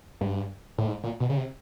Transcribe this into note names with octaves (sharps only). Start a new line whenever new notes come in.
G2
A2
G#2
A#2
B2
C#3
C3